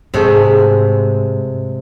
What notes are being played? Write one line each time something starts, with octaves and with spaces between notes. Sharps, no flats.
G#2 C3 G#3 A3